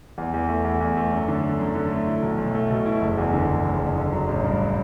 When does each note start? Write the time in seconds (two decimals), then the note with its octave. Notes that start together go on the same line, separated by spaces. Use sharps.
0.18 E2
0.34 E2
0.49 A3
0.64 E2
0.81 E2
0.97 A3
1.12 F#2
1.28 D3
1.43 D3
1.60 F#2
1.75 D3
1.91 A3
2.07 E4
2.23 B1
2.38 B1
2.55 A3
2.71 B2
2.86 E4
3.02 F#1
3.18 E2
3.33 D3
3.49 F#1
3.65 F#1
3.81 F#1
3.96 D3
4.12 F#3
4.28 A1
4.44 G2